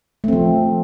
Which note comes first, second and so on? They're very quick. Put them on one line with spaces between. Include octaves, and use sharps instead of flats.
A3 C4 F3